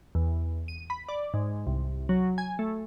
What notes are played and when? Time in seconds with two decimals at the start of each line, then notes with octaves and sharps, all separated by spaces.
0.15 E2
0.68 D#7
0.90 B5
1.09 D5
1.34 G#2
1.67 C2
2.09 F#3
2.38 G#5
2.59 A3